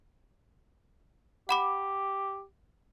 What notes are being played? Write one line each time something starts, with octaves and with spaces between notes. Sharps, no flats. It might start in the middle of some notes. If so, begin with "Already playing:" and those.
G4 F#5 B5 D6